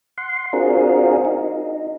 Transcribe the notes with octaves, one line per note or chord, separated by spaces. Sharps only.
F#5 C6
C4 D4 F4 F#4 G#4 A#4
D#4